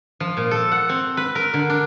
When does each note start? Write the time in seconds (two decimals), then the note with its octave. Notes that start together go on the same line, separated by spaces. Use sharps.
0.20 F3
0.37 A#2
0.51 A4
0.72 F#5
0.89 C4
1.17 B4
1.35 A#4
1.54 D3
1.70 D4